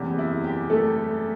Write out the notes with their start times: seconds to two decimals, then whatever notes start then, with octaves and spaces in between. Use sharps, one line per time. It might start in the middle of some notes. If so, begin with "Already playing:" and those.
Already playing: F#1 E2 C3
0.19 E4
0.44 G3 G4
0.70 A3 A4